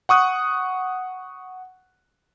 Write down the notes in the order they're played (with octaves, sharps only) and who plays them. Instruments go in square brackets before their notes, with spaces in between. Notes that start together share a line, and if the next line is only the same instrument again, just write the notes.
[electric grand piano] F#5 C#6 D#6 F#6